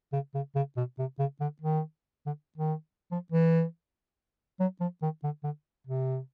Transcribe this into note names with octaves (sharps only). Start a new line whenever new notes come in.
C#3
C#3
C#3
B2
C3
C#3
D3
D#3
D3
D#3
F3
E3
F#3
F3
D#3
D3
D3
C3